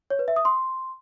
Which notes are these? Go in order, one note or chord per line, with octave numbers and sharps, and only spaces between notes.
C#5
B4
E5
D#6
C6